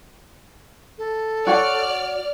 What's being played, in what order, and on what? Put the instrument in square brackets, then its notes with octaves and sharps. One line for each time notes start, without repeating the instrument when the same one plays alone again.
[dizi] A4
[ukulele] F#4 C#5 F#5 [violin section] D5 F6